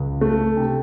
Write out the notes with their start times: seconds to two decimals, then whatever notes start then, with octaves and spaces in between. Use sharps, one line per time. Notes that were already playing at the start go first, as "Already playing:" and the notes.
Already playing: C#2
0.21 A3
0.57 C3